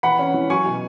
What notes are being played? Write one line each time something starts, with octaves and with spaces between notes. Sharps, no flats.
E2 F#5 B5
C#4
E3
F#3 G#5 C#6
B2